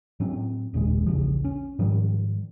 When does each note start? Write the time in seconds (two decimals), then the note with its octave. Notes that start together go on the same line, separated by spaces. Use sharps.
0.20 A2 F#3 C4 C#4
0.74 F#1 D#2 A#2 G#3
1.06 A#1 E2 C#3 F3
1.44 C#4
1.79 G#2 D#3 F3 G3